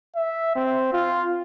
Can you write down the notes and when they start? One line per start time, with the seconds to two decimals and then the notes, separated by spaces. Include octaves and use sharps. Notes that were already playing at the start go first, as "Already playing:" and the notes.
0.16 E5
0.56 C4
0.93 F4